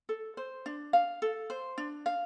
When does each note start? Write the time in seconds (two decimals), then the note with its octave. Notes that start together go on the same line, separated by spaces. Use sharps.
0.09 A4
0.37 C5
0.66 D4
0.93 F5
1.22 A4
1.50 C5
1.78 D4
2.06 F5